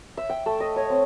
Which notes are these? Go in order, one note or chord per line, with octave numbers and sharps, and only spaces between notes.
E5
G5
A3
D#5
C#5
C4